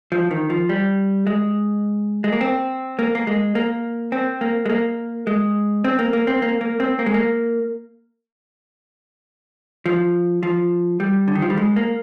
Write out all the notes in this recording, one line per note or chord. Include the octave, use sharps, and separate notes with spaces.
F3
D#3
F3
G3
G#3
G#3
A#3
C4
A#3
A#3
G#3
A#3
C4
A#3
G#3
A#3
G#3
C4
A#3
A#3
C4
A#3
A#3
C4
A#3
G#3
A#3
F3
F3
G3
D3
D#3
F3
G3
G#3
A#3